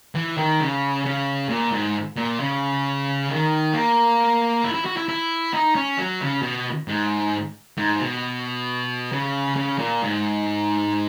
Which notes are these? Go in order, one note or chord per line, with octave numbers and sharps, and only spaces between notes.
E3
D#3
C#3
C#3
A#2
G#2
A#2
C#3
D#3
A#3
E4
E4
F#4
E4
E4
D#4
C#4
F#3
C#3
B2
G#2
G#2
B2
C#3
C#3
A#2
G#2